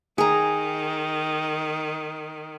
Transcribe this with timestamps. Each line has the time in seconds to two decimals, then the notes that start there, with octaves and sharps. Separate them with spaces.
0.18 D#3 G#4 A#5